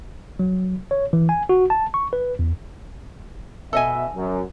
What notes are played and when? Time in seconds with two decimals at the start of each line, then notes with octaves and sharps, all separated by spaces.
0.39 F#3
0.91 C#5
1.13 E3
1.29 G#5
1.49 F#4
1.70 A5
1.94 C#6
2.13 B4
2.39 E2
3.73 B2 A4 D#5 E5 G#5
4.15 F#2